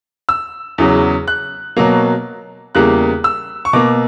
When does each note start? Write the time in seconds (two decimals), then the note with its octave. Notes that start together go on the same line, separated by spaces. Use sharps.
0.29 E6
0.78 E2 C#3 F#3
1.28 F#6
1.77 B2 F#3 A#3
2.75 E2 C#3 G3 A#3 F#6
3.24 E6
3.65 C#6
3.73 B2 A#3 D6